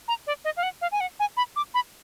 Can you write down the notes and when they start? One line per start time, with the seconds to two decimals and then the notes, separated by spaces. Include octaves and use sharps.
0.08 A#5
0.27 D5
0.45 D#5
0.57 F5
0.63 F#5
0.82 F5
0.92 G#5
1.01 F#5
1.20 G#5
1.37 B5
1.56 D6
1.74 B5